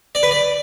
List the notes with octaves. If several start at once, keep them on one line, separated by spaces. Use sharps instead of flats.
D5
B4
D5